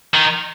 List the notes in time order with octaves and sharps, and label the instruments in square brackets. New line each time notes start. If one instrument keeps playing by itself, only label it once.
[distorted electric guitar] D#3